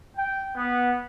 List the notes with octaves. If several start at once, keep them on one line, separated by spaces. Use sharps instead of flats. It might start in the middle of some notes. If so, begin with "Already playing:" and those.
G5
B3